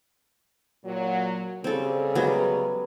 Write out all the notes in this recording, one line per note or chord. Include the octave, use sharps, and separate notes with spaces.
A#2 F#3
C#3 G3 C4 A4
F#3 G#3 B3